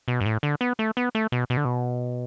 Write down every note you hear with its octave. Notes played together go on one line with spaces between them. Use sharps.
B2
G2
A2
D3
B3
A3
B3
A3
B2
B2
D3
B2